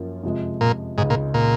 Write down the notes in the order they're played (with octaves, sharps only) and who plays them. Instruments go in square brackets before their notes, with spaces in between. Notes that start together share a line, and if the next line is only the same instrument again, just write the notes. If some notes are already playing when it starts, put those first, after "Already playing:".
Already playing: [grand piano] F#2 F3 A#3 C#4 F4
F2 C3 F3 G#3
[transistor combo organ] A#2
[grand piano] C#2 C#3 G#3 D#4 [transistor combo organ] G#2
[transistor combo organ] A#2
A#2